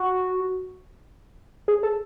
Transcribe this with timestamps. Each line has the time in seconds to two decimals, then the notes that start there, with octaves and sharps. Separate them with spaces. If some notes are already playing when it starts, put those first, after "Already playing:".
Already playing: F#4
1.68 G#4
1.83 A4